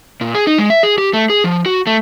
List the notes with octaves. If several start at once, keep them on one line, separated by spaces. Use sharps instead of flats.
A#2
G#4
D#4
G#3
E5
G#4
G4
A3
G#4
F3
F#4
A3